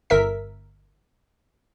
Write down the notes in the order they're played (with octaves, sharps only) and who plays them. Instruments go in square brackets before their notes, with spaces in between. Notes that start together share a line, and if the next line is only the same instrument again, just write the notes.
[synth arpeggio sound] G1 A#4 E5 B6